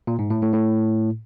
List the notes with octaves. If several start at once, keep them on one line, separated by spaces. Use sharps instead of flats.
A#2
G#2
A2
A2
A2